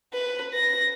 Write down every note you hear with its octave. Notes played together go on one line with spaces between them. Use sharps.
B4
A#6